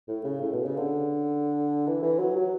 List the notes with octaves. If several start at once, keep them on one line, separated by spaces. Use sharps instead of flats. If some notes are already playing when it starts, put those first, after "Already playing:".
A2
C#3
A2
B2
C#3
D3
E3
E3
F#3
F#3